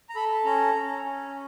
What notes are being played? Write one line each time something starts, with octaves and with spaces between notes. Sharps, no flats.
A#5
A4 B5
C#4 A#5
C#4
C#4